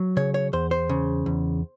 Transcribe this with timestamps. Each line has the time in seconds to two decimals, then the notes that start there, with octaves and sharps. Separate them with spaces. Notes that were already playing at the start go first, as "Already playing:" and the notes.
Already playing: F#3
0.17 C#3 C#5
0.34 C#5
0.53 E2 C5
0.71 C5
0.89 C#3
1.26 E2